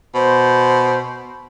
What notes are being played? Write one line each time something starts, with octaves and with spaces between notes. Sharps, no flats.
B2 C5